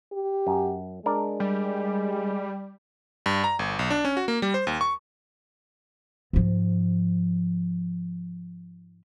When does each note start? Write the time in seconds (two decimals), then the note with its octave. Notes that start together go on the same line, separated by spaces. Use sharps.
0.12 G4
0.47 F#2
1.06 G#3 D4 A#4
1.40 G3
3.26 G2
3.44 A#5
3.59 G1
3.79 B1
3.90 D4
4.05 C#4
4.17 F#4
4.28 A#3
4.42 G3
4.54 C5
4.67 D#2
4.81 C#6
6.33 G#2 F3